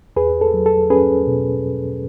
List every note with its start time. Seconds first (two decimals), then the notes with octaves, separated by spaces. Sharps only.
0.16 E2 G#4 B4
0.41 A4
0.54 F#3
0.66 A4
0.90 C#4 G#4 B4
1.27 B2